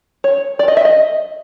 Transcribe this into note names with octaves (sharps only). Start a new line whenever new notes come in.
C#5
D5
D#5
E5
D#5